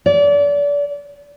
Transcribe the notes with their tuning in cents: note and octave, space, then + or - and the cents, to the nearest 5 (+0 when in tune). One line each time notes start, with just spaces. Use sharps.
D5 -30